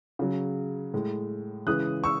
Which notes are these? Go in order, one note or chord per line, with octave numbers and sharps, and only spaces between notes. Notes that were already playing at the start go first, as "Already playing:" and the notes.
C#3 F#3
A2 G#3
C#3 E3 G#3 D#6 F#6
C#6 E6